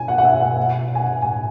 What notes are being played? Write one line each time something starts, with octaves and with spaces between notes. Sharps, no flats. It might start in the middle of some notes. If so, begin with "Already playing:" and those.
Already playing: B2 G#5
F#5
F#5
E5
F#5
F#5
G#5
F#5
A2 G#5